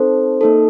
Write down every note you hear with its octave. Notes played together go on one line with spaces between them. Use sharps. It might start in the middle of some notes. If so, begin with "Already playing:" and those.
Already playing: C4 D#4 A4 C5
A#3 D#4 A4